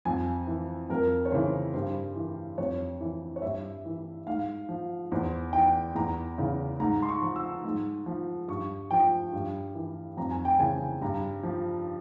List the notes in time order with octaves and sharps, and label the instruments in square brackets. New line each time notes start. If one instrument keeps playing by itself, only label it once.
[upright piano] F2 G#5
E3
F2 A#4
C#5
C#3 E3 C5
G2 C5
E3
F2 C#5
E3
C#5
G2 E5
E3
G#2 F5
F3
E2 C5
E3 G5
E2 A#5
C#3 E3
G#2 A#5
C6
C#6
F3
E6
G#2
F3
G2 C#6
F3 G5
G2
E3
F2 A#5
G#5
G5
C#3 E3 G#5
G2 A#5
F3